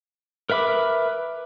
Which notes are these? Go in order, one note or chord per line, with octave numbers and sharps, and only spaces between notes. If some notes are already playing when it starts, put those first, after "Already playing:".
A#4 B4 E5 B5 D6